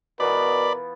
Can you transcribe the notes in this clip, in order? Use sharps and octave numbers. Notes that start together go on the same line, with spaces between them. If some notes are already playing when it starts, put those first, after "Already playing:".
B2 E3 B3 F4 A#4 D5 B5